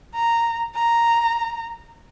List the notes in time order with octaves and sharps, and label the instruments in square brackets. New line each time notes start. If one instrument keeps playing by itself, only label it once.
[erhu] A#5
A#5